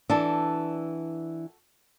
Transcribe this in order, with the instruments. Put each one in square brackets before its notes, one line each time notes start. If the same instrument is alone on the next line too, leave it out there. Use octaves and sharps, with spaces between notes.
[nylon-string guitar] E3 D4 [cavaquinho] F#4 A4 A5